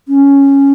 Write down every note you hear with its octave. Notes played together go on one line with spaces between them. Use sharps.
C#4